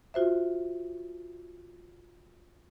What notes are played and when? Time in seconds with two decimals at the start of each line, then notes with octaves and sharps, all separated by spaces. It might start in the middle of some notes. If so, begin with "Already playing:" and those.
0.14 F4 F#4 C5 E5